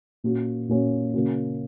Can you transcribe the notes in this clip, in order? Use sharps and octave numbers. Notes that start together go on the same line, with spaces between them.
A#2 A#3 C#4 F#4
A#2 A#3 C#4 F#4
C#3 A#3 C#4 F#4